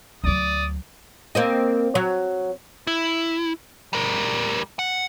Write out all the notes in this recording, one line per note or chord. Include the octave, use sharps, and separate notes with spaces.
D2 F#3 D5 D#6
A#3 C4 D#5
F#3
E4
G3 A#4
F#5